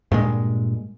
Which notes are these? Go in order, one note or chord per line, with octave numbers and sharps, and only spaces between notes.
G2 A#2 G#3